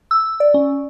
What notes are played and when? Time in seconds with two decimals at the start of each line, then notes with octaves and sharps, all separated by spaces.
0.11 E6
0.40 D5
0.54 C#4